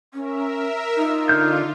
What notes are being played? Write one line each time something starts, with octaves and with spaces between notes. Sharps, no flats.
C#4 A#4 E5
D#4 F4
D3 F6 G6